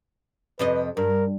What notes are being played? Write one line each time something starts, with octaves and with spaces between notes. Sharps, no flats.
F2 C3 B4 D#5
G2 A#4